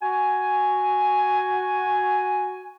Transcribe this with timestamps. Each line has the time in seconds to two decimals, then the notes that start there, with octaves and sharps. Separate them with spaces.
0.03 F#4 G#5